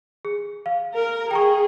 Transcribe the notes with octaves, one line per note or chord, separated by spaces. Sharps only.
G#4
F5
A#4
G#4 G5 A#5 C#6